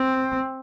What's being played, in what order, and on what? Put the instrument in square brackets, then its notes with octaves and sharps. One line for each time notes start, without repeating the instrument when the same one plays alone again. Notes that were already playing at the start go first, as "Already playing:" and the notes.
Already playing: [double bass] C4